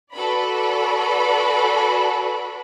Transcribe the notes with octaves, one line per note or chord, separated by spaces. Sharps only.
F#4 A4 B4 D5 B5